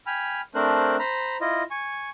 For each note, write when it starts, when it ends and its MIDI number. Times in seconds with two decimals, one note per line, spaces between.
0.07 0.41 79
0.07 0.41 80
0.07 0.41 83
0.07 0.41 89
0.55 0.96 57
0.55 0.96 60
0.55 0.96 62
0.55 0.96 70
0.55 0.96 72
0.55 0.96 90
0.99 1.37 72
0.99 1.37 82
0.99 1.37 83
1.41 1.63 64
1.41 1.63 65
1.41 1.63 75
1.71 2.10 80
1.71 2.10 85